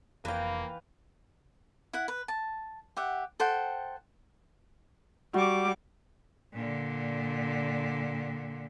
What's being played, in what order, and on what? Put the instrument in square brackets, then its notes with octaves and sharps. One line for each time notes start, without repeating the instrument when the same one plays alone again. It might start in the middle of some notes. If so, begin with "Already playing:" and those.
[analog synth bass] F1 [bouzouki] E3 G5 [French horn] A#3 [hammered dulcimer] B4 F5
[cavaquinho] E4 F#5
B4
A5
G4 E5 F#5
A4 C5 F#5 G5
[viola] G3 D6 [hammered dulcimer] F#4
[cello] A#2 D3